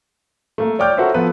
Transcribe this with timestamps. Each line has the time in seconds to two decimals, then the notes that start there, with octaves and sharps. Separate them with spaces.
0.58 A3 A#3
0.79 C#5 D5 G5 D6 F6 G6
0.97 F#4 A4 A#4 C5 C#5 E5
1.14 F3 B3 A4 B4